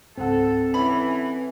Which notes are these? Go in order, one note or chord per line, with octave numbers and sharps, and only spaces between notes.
C#2 G#2 C4 A4 F#5
E3 C#4 B4 G#5 B5